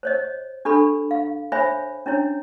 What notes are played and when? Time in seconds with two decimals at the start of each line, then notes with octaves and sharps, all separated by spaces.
0.03 C5 C#5 D#5
0.65 D4 G4 A4 B5
1.11 F5
1.52 C5 C#5 E5 G#5 B5
2.06 C#4 D4 E4 C#5